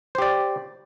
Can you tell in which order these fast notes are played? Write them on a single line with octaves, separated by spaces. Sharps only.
C5 G4 D5